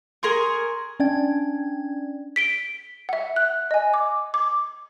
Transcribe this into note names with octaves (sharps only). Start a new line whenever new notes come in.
G#4 A#4 C6 C#6
C#4 D4 D5 G5 G#6
B6 D7 G7
E5 F#5
F#6
D#5 G#5
D6
D6